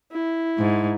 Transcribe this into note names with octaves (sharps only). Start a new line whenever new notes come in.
E4
G#2